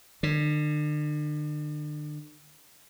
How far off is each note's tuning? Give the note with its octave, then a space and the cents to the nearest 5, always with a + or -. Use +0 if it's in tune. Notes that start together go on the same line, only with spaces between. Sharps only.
D3 +40